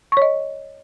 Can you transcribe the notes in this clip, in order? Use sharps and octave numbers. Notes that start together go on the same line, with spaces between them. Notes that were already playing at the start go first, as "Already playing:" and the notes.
C#5 D#5 C#6